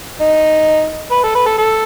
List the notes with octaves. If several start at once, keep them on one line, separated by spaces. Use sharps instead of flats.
D#4
B4
A4
B4
A4
A4